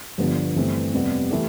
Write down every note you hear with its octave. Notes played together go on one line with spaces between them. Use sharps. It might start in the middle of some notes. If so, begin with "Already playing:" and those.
G1 G2 D3 F3 B3
G1 G2 E3 A3 C4
F2 C3 G3 B3
E3 A3 E4 G4